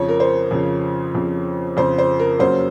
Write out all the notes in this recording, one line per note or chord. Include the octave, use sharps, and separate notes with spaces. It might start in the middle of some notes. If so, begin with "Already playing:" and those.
Already playing: F2 C#3 F3 C#5
A#4
C5
F2 C#3 F3
F2 C#3 F3
F2 C#3 F3 C5
C5
A#4
F#2 C#3 F#3 A#3 C#4 C5